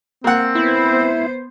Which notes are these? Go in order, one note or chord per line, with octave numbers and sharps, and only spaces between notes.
A#3 C4 F#5
B3 E4 C5